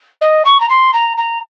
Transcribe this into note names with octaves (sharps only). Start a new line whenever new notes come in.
D#5
C#6
A#5
C6
A#5
A#5